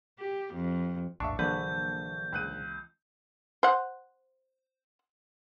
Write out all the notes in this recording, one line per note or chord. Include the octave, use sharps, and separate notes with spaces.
G4
F2
A#1 E2 A2 D4 E5 A5 C#6
A#1 D3 E3 F#3 A#3 B4 G6
C#2 F#6 D#7
C5 F#5